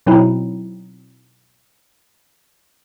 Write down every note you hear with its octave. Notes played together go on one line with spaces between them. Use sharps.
B2 F#3 C4 D#4 E4